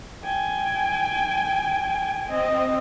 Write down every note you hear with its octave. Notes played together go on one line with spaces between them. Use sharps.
G5 G#5
C4 D#5